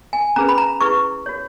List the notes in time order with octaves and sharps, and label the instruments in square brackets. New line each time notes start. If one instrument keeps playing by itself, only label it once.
[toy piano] G#5
C#4 G#4 B4 A#5
B5
A#5
E4 G#4 B4 C#6
F#4 C#5